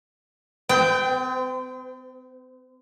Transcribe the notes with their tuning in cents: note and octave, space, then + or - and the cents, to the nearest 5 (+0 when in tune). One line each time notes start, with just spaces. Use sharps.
C4 -45 G5 +0